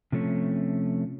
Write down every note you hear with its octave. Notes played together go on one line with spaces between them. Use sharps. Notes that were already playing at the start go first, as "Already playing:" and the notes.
C3 F3 A3 C#4